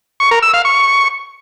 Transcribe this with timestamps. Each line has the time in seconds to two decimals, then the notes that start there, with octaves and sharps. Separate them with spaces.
0.20 C#6
0.31 A#4
0.42 E6
0.54 F5
0.65 C#6